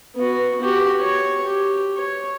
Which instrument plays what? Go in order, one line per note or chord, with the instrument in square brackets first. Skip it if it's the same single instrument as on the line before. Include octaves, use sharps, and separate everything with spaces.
[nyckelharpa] B3 F#4
F#4 G4
C#5
G4
C#5